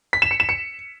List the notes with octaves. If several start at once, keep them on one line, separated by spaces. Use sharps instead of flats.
B6
E7
C#7
E7
C#7